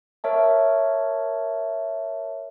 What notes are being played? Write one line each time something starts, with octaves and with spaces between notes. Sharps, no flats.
A#4 C#5 E5 A5